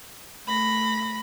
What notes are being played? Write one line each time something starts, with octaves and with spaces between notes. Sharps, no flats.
A3 B5 A#6